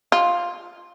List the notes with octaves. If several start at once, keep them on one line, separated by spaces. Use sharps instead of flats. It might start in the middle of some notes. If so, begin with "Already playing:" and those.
F4